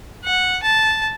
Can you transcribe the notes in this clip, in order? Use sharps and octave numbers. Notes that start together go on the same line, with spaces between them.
F#5
A5